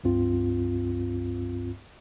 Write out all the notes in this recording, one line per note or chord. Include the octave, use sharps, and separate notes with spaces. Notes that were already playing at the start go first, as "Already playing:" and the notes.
C#2 G2 C4 F4